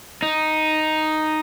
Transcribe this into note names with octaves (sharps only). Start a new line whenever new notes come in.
D#4